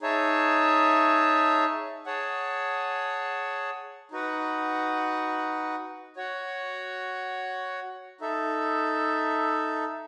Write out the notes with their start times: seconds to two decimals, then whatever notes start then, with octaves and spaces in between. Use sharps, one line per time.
0.02 D#4 G#4 C#5 E5 A5
2.06 G#4 C#5 F#5 A5
4.11 D#4 F#4 B4 F#5
6.16 F#4 C#5 F#5
8.21 D#4 A4 E5